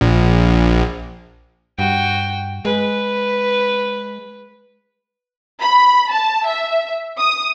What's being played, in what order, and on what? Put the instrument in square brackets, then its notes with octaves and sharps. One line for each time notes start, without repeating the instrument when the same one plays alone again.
[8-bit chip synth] A#1
[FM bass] G2 [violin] F#4 G5
[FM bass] G#3 [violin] B4
[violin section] B5
A5
E5
D#6